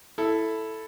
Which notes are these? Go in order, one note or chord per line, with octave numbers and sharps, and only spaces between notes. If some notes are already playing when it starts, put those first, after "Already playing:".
E4 A4